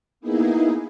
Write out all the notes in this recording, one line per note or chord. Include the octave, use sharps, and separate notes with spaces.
A#3 B3 D#4 E4 G#4